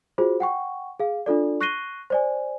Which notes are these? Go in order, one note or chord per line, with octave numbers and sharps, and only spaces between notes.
F4 F#4 G#4 C5
F#5 G5 C#6
G#4 F5
D4 F4 A4 D5
C#6 F#6 A#6 C7 D#7 G7
C5 D5 G#5